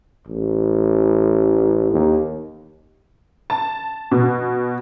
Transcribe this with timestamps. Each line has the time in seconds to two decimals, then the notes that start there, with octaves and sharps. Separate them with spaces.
0.27 A1
1.92 D#2
3.50 A5
4.12 B2